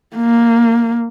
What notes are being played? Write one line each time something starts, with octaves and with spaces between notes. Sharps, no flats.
A#3